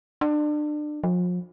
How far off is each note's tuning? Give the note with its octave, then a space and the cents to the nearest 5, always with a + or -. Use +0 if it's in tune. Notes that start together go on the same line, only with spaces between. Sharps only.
D4 +30
F3 +40